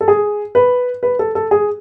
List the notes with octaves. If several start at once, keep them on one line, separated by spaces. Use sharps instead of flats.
A4
G#4
B4
B4
A4
A4
G#4